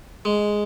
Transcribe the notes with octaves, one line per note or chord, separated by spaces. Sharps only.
G#3